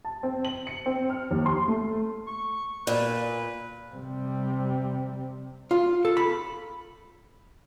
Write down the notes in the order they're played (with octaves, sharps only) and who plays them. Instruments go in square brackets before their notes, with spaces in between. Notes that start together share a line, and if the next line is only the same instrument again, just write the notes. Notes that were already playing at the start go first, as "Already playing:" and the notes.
[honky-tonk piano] A5
C4
F#7
C#7
C4
F6
D#2
C6
A3
[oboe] C#6
[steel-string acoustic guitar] A#2 [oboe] B4
[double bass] C3 G3
[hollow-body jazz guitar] F4
A4
B5